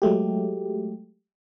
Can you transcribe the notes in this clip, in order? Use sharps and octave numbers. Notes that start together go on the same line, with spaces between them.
F#3 G#3 A3 G4